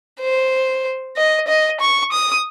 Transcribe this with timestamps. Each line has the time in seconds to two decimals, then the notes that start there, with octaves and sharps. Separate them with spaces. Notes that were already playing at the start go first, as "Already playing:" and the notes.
0.20 C5
1.17 D#5
1.48 D#5
1.81 C#6
2.12 D#6